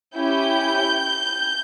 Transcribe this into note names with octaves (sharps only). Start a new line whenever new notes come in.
C#4 E4 G4 G6